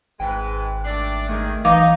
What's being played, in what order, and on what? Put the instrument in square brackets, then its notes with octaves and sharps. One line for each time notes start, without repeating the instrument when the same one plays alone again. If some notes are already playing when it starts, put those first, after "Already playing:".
[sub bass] G#1 [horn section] G#2 G#3 B4 [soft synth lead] G5
[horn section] A3 D4 D5
[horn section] D#3 G#4 [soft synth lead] A3
[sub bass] B1 [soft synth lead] E3 [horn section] D#4 [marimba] F5 D6